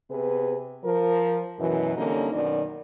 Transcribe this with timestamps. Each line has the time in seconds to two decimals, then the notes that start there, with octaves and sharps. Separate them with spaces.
0.11 C3 B3 G#4 B4
0.84 F3 A#4
1.59 F#2 B2 E3
1.97 D3 G3 A#3 C4 C#4 D#4
2.33 F#2 B2 D#3 C#4 D5